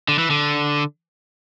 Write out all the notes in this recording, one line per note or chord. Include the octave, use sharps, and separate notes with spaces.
D3
E3
D3